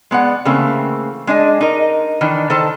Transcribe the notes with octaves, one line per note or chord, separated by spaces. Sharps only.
G#3 B3 D5 F#5
C#3 E3 A3 A#3 C4
G#3 D4 D#5 G#5
D#4 A#4
D#3 E3 D4
D#3 A4 C5 A5